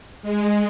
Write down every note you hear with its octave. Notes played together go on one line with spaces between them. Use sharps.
G#3